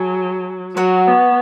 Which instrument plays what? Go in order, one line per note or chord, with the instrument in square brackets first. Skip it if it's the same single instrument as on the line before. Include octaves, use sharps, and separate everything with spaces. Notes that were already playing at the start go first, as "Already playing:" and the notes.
Already playing: [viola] F#3 [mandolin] G#4 A5
[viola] F#3 [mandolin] F#4 C#5 F#5
[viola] B3